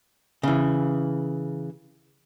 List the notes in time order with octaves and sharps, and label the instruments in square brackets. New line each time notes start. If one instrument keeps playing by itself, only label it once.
[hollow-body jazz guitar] C#3 E3